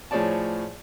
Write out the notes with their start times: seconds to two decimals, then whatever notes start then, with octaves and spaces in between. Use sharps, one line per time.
0.11 A2 F3 G#4 C#5 D5 A5